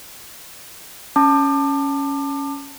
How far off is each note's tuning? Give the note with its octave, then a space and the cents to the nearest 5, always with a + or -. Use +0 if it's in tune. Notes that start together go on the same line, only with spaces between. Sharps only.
C#4 +0 A5 +10 D6 +30